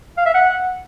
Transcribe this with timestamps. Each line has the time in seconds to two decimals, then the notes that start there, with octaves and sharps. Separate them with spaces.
0.18 F5
0.26 E5
0.34 F#5